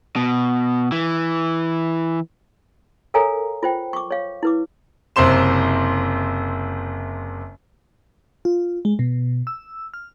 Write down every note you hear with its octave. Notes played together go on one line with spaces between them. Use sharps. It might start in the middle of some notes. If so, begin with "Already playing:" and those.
B2
E3
A4 A#4 C#5 F5 G#5 A#5
F4 C5 G5
C#6 D6
C#5 F5
E4 B4 D6
F#1 C3 C5 C6 E7
F4
G#3
B2
E6
F6